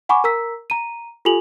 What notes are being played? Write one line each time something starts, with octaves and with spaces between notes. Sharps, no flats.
F#5 G#5 B5 C#6 D6
A#4 A#5 E6 B6
A#5 D#7
F4 G4 A4 G#5 F7 F#7